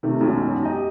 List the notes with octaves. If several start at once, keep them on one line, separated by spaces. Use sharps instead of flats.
C3 D#3 A3
E1 B1 F#2 D#3
G4 D#5 G5 A#5